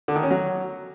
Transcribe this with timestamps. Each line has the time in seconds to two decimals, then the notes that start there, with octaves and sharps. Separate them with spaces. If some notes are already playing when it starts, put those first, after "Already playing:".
0.08 D3
0.16 D#3
0.23 C#4
0.31 F#3